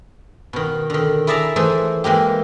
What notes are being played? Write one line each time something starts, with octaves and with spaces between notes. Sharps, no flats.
B2 D#3
D3 D#3
E4 G#4 D5 E5 A5 A#5
E3 A3 D#4 G#4 C5
E3 G#3 A#3 G4